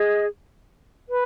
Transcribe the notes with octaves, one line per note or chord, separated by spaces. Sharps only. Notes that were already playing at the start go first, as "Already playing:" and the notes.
Already playing: G#4 D#5
B4